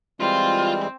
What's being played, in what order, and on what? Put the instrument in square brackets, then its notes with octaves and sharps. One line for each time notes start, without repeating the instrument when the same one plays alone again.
[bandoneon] E3 G3 G#3 [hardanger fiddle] C4 [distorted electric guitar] F4